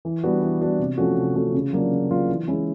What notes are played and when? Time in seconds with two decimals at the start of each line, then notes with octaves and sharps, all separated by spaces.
0.05 E3
0.24 G3 B3 D4 F#4
0.42 E3
0.61 G3 B3 D4 F#4
0.79 C3
0.98 F3 A3 C#4 F#4
1.17 C3
1.35 F3 A3 C#4 F#4
1.54 C#3
1.73 F#3 A#3 D4 F4
1.92 C#3
2.10 F#3 A#3 D4 F4
2.29 E3
2.48 G#3 C#4 E4